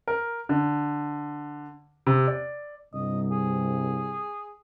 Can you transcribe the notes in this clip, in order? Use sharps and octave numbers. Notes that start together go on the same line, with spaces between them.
A#4
D3
C3
D5
C2 G2 C3 D#5
G#4